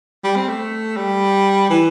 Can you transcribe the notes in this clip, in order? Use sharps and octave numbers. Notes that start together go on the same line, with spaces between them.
G3
C4
A3
G3
E3